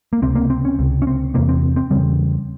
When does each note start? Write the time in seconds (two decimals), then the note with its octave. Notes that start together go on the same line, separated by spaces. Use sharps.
0.13 A#3
0.22 C#2 C3 C4
0.35 A#3
0.50 C4
0.65 C#4
0.79 C#2 C3
1.02 C#4
1.07 C4
1.34 E2 C3 A#3
1.49 C4
1.76 C4
1.91 E2 C#3 G3